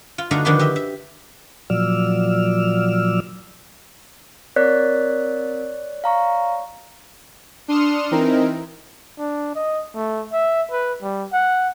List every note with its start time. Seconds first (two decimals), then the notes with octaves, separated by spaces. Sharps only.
0.18 F4
0.31 D3 A3 D#4 F#4 F5 A#5
0.45 D3 D#3 F3 F#4 G4 B4
0.59 G4 D#5 E5
0.76 E5
1.70 A#2 F3 F#3 D5 E6 F6
4.56 C4 A#4 C#5 D5 F#6 B6
6.04 F5 A#5 C#6
7.68 D4 C6 D#6 F6 C#7 E7
8.11 E3 C4 D#4 A#4
9.19 D4
9.56 D#5
9.95 A3
10.33 E5
10.71 B4
11.02 G3
11.33 F#5